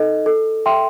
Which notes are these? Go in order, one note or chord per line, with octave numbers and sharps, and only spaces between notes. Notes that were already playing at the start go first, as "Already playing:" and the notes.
Already playing: D#4 A4 D#5
A4
E5 G5 C6